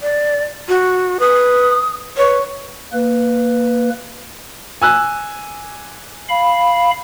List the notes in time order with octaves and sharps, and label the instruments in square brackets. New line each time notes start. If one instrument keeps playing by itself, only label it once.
[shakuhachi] D5
F#4
[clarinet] B4 [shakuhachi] D#6
[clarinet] B4 [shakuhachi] C#5
[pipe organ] A#3 B4
[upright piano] G#5 E6 F#6
[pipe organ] F5 B5